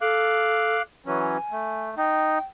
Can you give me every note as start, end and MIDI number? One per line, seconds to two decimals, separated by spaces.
0.01 0.77 69
0.01 0.82 77
0.01 0.82 86
0.01 0.82 90
1.06 1.38 52
1.06 1.38 54
1.06 1.38 61
1.06 1.84 80
1.52 1.95 57
1.97 2.38 63
1.97 2.43 79